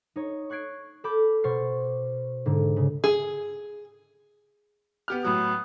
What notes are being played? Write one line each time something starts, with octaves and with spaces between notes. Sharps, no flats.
D#4 C#5
C#6 F#6 G#6 C7 D7
A4 B5 D6 G6
B2 C5 C#6 F6 A6 C7
G#2 D3
C#3
G#4
B3 G4 F6
A2 F#3 B3